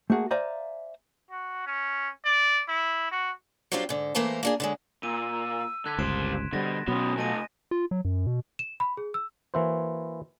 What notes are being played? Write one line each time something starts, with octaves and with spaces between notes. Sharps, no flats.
A3 A#3 F#4 G#4
C5 D5 E5 F5 G#5 A#5
F#4
C#4
D5
E4
F#4
F#3 G3 C4 D4 F4 G4
G#2 D3
E3 A3 A#3 A#4 C5 A5
A#3 D4 G#4
D3 F#3 G#3
A#2 E6 D#7
D3 F#6 G#6 B6
G1 C#2 G3 C5 C6 D7 E7
B2 D3 G3 C5 A6 A#6
B2 F#3 B3 C#4 D#6
C3 A3 D#5 G#5 A#6 D#7
F4
F#3
F#2
B2
E7
B5
G#4
E6
E3 A#3 E4 F#4 C5